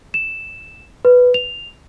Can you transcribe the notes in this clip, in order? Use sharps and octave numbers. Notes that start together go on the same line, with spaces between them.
E7
B4
F7